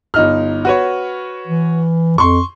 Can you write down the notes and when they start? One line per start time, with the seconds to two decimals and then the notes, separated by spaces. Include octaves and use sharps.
0.14 G1 D#4 F6
0.65 F#4 B4 C#5
1.47 E3
2.18 F2 C6 C#6